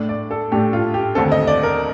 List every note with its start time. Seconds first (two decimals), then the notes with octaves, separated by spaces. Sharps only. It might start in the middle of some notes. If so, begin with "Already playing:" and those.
Already playing: A2 A3 D4
0.09 D5
0.31 A4
0.52 A2 A3 D4 G4
0.73 F4
0.94 G4
1.15 D#2 D3 A3 C4 A4
1.32 D#5
1.47 D5
1.63 A#4